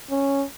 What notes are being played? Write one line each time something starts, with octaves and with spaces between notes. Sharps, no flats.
C#4